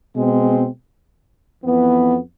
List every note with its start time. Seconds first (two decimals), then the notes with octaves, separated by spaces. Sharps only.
0.14 B2 G#3 C4
1.64 F2 E3 B3